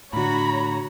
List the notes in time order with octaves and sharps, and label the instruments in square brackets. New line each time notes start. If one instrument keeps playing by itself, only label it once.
[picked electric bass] A2 D3 [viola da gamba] F#4 [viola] C#5 A#5 [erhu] B5